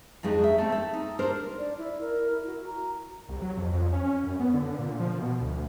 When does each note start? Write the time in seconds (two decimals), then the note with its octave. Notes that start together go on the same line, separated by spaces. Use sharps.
0.23 F2 F#3 G#3 D4 D#4
0.44 E5
0.58 A3 C4
0.72 A4
0.93 D#4
1.19 D4 A#4 C5
1.58 D5
1.78 E4
2.01 A#4
2.31 E4
2.46 F#4
2.66 A#5
3.29 C2
3.42 F#3
3.57 F2
3.73 F2
3.92 C#4
4.24 F#2
4.40 B3
4.54 D3
4.78 A#2
5.00 F3
5.18 B2
5.41 D2